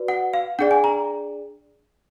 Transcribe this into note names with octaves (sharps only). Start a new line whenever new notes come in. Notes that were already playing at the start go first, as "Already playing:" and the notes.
Already playing: F#4 B4 D5
F#5
F5
D4 G#4 D5 F#5
G#5
A#5